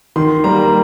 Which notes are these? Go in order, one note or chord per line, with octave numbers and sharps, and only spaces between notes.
D#3 C6
G3 A#3 A#5